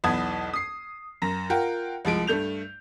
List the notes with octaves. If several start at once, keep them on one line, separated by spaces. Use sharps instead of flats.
B1 E2 B3 A5 D#6 G#6
D#6 C7
F#2 A#5 A#6
F4 A#4 F#5 G5
C2 F3 G#3 D7
G2 A3 G6 F7